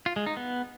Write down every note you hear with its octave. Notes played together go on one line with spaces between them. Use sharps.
F4
G#3
D#4
B3